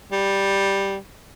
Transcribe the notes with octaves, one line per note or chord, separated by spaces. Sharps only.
G3